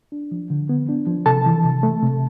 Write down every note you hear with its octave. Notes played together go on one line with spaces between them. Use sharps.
D4
F3
D3
B3
D4
F3
C3 A4 A5
E3
C3
A3
C3